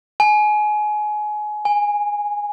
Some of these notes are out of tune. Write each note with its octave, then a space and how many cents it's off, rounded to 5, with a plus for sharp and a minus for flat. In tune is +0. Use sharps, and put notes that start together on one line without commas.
G#5 +25
G#5 -10